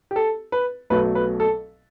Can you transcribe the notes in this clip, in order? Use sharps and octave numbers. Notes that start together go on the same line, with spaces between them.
G4
A4
B4
B1 B2 F#3 A3 B4
B4
A4